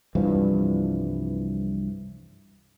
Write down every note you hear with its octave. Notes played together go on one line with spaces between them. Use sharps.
C2 G2 E3 F3